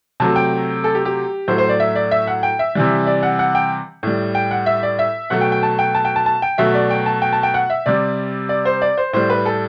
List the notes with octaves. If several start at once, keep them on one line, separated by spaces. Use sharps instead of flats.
C3 F#3 A3 A5
G5
A4
G4
G4
A2 F#3 A3 C5
C5
D5
E5
D5
E5
F#5
G5
E5
C3 E3 G3
D5
F#5
F#5
G5
A2 G3
G5
F#5
E5
D5
E5
B2 F#3 A3 F#5
G5
G5
A5
G5
A5
G5
A5
A5
G5
B2 F#3 A3 E5
D5
G5
A5
G5
A5
G5
F#5
E5
C3 G3 D5
D5
C5
D5
C5
A2 G3 C5
B4
A4